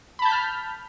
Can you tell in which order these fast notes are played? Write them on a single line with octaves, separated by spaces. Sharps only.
B5 A5 G6 B6 F6